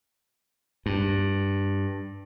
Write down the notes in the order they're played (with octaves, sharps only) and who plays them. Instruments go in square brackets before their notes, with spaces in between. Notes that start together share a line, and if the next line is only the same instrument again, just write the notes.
[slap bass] G2